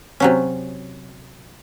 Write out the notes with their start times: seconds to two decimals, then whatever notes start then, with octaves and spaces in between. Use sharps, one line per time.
0.20 C3 F#3 C#4